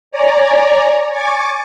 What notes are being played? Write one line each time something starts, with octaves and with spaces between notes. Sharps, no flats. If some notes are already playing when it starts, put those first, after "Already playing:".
C#5 D5 G#5 A#5
G#5 C#6 D6 A6